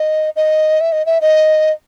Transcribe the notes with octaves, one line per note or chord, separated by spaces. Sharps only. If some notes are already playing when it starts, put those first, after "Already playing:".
Already playing: D#5
D#5
E5
D#5
E5
D#5